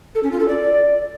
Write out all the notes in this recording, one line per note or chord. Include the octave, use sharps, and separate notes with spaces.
A4
C#4
F4
A4
D5